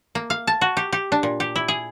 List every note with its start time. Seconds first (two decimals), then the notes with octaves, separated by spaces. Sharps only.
0.15 A#3
0.30 F5
0.47 A5
0.61 F#4
0.77 G4
0.92 G4
1.12 D4
1.23 A#2
1.40 G4
1.56 E4
1.68 G#4